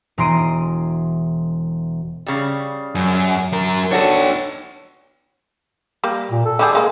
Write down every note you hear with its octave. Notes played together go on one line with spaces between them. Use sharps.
E1 A#5 C6 D7 D#7
C#3 G3
F#2
F#3 A#4
D4 D#4 F#4 A4 C#5
G3 A#3
A#2
A4
D3 G3 G#4
G#3 A#3